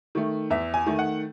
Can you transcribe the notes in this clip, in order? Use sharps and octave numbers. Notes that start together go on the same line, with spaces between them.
D#3 A3
E2 E5
G#5
D#3 A3
F#5